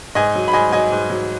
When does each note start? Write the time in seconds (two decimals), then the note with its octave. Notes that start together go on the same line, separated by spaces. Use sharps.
0.15 G#2 D#5 G#5
0.35 F#3
0.48 B5
0.53 G#2 D#5 G#5
0.72 F#3 D#5 G#5
0.92 G#2
1.10 F#3